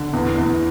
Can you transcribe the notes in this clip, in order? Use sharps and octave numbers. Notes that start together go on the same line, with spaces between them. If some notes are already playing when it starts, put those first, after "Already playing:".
Already playing: D3
E2
E2